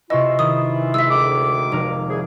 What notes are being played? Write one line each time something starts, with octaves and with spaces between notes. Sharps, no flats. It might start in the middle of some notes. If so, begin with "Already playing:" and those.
C3 E3 E4 F4 D#5 C#6 E6
D#3 D#6
G#3 E5 E6
D2 D#3 D6
F1 D#4 A#4
C2 G#4